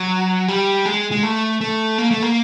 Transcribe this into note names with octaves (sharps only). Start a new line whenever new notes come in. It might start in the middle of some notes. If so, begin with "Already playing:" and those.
Already playing: F#3
G3
G#3
G#3
A3
A3
A#3
A3
A#3